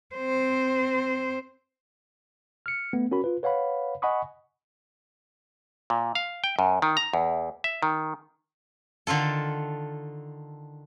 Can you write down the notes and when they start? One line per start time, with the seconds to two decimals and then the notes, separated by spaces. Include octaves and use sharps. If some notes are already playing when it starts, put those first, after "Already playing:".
0.15 C4 C5
2.66 F6 C#7
2.93 A3 B3
3.11 C#4 F#4 A#4 B5
3.24 F4 B4
3.43 B4 C#5 F5 F#5 B5
4.02 D#5 F#5 G#5 B5 C#6 D#6
5.90 A#2
6.15 F5
6.44 G5
6.59 F#2
6.82 D#3
6.97 A#5
7.13 E2
7.64 E5
7.83 D#3
9.07 D3 D#3 F4 A4